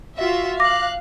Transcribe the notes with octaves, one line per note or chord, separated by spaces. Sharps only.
F4 F#4 E5
F5 D6 F#6 A#6